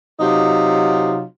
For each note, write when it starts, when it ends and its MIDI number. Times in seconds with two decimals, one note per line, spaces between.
0.20 1.23 48
0.20 1.23 54
0.20 1.23 63
0.20 1.23 65